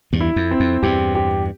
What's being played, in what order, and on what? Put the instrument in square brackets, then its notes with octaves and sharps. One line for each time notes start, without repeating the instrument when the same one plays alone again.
[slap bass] E2 G2
[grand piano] E4
[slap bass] F2
[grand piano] C4
[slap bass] F2
[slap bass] E2 G2 [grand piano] G4
[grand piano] G4